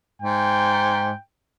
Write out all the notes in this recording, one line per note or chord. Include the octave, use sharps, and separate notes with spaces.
G#2 G5